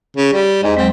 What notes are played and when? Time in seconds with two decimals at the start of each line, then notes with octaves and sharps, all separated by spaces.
0.17 C#3
0.34 G3
0.63 E2 G#2 D#5
0.77 F#3 G#3 C4